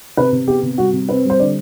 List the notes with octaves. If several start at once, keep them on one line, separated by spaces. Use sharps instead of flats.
C3 B4
C3
B3 G4
C3
G3 F#4
C3
C4 B4
G3 C5
D3 D5